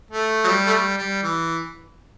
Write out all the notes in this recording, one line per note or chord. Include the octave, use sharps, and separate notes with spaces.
A3
F#3
G3
A3
G3
G3
E3